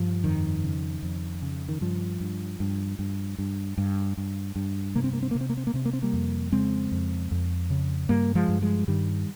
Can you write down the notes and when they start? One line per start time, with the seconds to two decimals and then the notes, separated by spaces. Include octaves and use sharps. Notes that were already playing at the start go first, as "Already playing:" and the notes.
Already playing: G2 F3
0.24 F2 D#3
0.63 C#3
1.03 F2
1.42 C#3
1.69 D#3
1.81 G2 F3
2.20 G2
2.60 G2
2.99 G2
3.38 G2
3.78 G2
4.17 G2
4.56 G2
4.95 C3 A#3
5.04 C4
5.13 A#3
5.23 C4
5.31 C3 A#3
5.41 C4
5.50 A#3
5.57 C4
5.67 A#3
5.74 C3 C4
5.85 A#3
5.93 C4
6.03 G3 A#3
6.13 F2
6.52 C#3 G#3 C4
6.92 F2
7.31 F2
7.70 C#3
8.09 G2 G3 A#3
8.35 F3 G#3
8.49 G2
8.62 F3 G#3
8.88 G2 D#3 G3